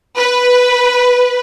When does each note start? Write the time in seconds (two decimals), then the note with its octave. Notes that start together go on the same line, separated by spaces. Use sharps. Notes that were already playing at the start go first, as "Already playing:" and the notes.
0.18 B4